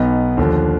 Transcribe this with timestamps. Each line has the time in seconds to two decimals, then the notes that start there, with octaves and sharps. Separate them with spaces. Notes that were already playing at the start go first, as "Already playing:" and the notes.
Already playing: B1 B2 B3 D#4
0.37 D#2 D3 F3